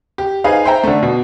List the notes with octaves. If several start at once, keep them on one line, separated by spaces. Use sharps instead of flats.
G4
D#4 G#4 B4 C5 F5
C5 E5 G5 A#5
D3 A3
B2